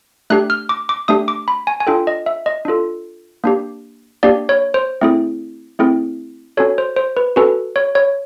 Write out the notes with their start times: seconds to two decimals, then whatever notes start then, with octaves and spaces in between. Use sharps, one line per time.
0.30 A3 D4 G4 F#6
0.50 F6
0.69 D6
0.89 D6
1.08 A3 D4 G4 D#6
1.28 D6
1.48 B5
1.67 G#5
1.80 G#5
1.87 D4 F4 A4 G5
2.07 D#5
2.26 E5
2.46 D#5
2.65 D4 F4 A4
3.44 A#3 D4 G4
4.23 A#3 D4 G4 D5
4.49 C#5
4.74 C5
5.01 A3 C4 E4 G#4
5.79 A3 C4 E4 G#4
6.57 C#4 F#4 A4 C#5
6.78 C5
6.97 C5
7.17 B4
7.36 C#4 F#4 A4 B4
7.76 C#5
7.95 C#5